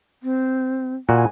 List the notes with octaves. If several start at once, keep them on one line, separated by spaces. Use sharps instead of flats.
C4
A#2 F#4 G#5